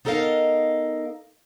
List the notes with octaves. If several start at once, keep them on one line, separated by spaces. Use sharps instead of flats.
B3 D#4 A4 A#4 D#5 F5